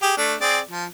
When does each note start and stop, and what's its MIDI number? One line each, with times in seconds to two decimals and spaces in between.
0.02 0.13 67
0.02 0.13 68
0.17 0.35 57
0.17 0.35 62
0.41 0.59 60
0.41 0.59 68
0.41 0.59 74
0.71 0.86 53